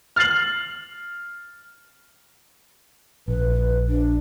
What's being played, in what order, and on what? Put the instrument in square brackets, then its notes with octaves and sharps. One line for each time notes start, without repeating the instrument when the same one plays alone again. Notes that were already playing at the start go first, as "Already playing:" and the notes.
[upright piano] F6 A6 C7 F#7
[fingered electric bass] A#1 [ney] B4
[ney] D4